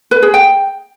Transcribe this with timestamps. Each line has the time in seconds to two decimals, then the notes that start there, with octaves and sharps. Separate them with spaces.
0.11 B4
0.22 G#4
0.34 G5